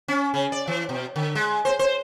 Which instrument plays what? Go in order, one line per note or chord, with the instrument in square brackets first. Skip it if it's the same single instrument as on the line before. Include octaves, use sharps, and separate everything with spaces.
[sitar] C#4
C#3
D5
E3
B2
D3
G#3
C5
C5